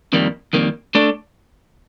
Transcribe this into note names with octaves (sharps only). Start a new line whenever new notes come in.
F2 D#3 G3 A#3
F2 D#3 G3 A#3
A3 D4 A4 D5